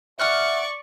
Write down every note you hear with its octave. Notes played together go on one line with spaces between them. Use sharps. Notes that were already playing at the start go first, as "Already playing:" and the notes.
D5 E5 F#5 C#6 F6 F#6